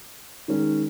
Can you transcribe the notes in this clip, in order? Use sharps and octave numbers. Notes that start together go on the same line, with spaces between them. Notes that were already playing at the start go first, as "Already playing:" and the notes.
D#3 G#3 C#4 G#4